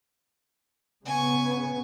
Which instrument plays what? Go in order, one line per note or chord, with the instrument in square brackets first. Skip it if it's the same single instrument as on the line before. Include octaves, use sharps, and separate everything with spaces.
[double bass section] C#3 B3 [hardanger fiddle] G#5 C#6